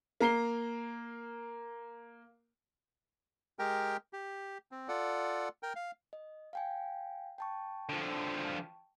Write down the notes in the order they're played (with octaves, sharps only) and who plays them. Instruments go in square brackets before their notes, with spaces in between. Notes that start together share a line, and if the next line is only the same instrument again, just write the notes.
[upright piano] A#3 A#5 C7 G7
[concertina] G#3 G4 A#4 G5
G4
C4
F4 A4 D5 F#5
A#4 G5
F5
[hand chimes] D#5
F5 G5 G#5
G5 A5 C#6
[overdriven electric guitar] D3 F3